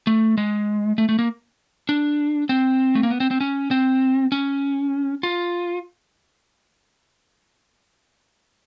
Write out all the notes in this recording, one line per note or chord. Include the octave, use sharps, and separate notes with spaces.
A3
G#3
A3
A3
A#3
D4
C4
A3
A#3
B3
C4
C4
C#4
C4
C#4
F4